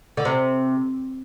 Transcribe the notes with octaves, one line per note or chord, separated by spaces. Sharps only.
D3
C3